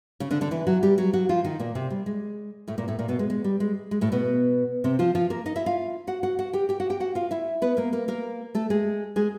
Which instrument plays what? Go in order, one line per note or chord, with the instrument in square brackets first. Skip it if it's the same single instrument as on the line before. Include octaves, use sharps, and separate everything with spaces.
[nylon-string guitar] C#3 C#4
D3 D4
D3 D4
E3 E4
F#3 F#4
G3 G4
F#3 F#4
F#3 F#4
F3 F4
D#3 D#4
A#2 A#3
C3 C4
G3
G#3
A2 A3
A#2 A#3
A2 A3
A#2 A#3
B2 B3
G#3
G#3
G3
G#3
G#3
A2 A3
B2 B3
C3 C4
F3 F4
F3 F4
A#3 A#4
D#4 D#5
E4 E5
F4 F5
F#4 F#5
F#4 F#5
F#4 F#5
G4 G5
G4 G5
F#4 F#5
G4 G5
F#4 F#5
F4 F5
E4 E5
B3 B4
A#3 A#4
A#3 A#4
A#3 A#4
A3 A4
G#3 G#4
G#3 G#4